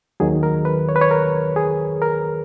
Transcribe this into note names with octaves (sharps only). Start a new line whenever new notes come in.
D#2 D#3 F#3 G#4
A#4
B4
C#5
B4
C#5
A#4
G#4
A#4